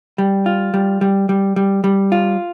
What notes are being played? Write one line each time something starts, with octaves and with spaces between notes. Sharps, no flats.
G3
F4
G3
G3
G3
G3
G3
F4